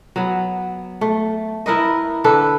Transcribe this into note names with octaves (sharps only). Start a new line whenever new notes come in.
F#3 B3
A3
E4 A#4 B4 D#5
D3 D4 A4 B4